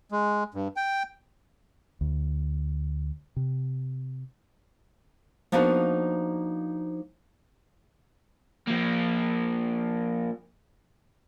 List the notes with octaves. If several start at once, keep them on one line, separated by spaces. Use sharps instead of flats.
G#3
G2
G5
D2
C3
F3 A#3 B3 D4 D#4 F#4
F3 A#3